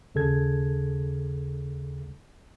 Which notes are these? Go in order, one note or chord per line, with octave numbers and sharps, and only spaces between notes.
D#2 C#3 G#4 A4 G#6